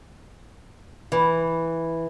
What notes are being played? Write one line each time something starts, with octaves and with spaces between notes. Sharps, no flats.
E3